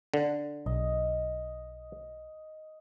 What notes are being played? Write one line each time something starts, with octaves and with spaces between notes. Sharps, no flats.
D3
B1 D#5